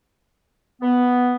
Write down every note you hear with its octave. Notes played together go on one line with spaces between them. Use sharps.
B3